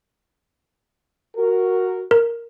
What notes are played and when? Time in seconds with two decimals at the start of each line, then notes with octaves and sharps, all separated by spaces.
1.36 F#4 A#4
2.11 A#4